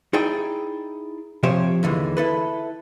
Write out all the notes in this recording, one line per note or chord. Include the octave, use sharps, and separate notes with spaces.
D#4 E4 G#4 D5 G5
C3 F3 G4 C5 C#5
D#2 D3 E3 G#3
E4 A4 B4